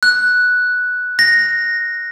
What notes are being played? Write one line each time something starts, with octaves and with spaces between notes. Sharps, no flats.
F#6
A#6